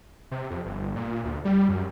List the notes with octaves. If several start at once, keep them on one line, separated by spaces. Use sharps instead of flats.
C3
F2
G1
A#2
D2
G3
F#2